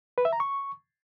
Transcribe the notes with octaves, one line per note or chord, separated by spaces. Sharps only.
B4
E5
A#5
C#6